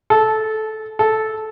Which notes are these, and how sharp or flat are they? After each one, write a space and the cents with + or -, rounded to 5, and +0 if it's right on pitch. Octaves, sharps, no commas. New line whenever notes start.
A4 -15
A4 -10